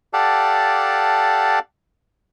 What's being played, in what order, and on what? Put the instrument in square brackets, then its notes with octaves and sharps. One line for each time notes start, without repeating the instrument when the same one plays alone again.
[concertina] G4 A4 D5 F5 F#5 A5